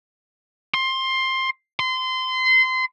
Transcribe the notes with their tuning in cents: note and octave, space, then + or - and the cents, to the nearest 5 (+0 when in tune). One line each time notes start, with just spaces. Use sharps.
C6 +15
C6 -25